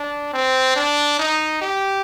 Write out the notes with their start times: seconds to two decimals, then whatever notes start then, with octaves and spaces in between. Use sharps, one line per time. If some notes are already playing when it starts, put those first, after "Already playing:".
Already playing: D4
0.33 C4
0.76 D4
1.19 D#4
1.62 G4